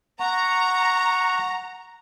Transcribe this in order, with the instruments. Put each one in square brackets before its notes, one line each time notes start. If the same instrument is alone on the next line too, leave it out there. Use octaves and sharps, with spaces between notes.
[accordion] F#5 C#6 [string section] A#5